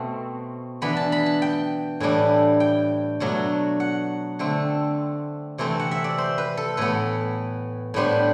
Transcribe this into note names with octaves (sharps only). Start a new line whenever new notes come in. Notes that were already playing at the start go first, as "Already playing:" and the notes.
Already playing: B2 A3 C4
E3 B3 D4 B5
A5
B5
A5
G5
A2 E3 G3 D4
G5
B2 F#3 A3 D4
F#5
D3 A3 C4
C3 E3 A3 C4
F#5
E5
D5
C5
B4
A4
A2 E3 B3 B4
A2 G3 B3 D4 C5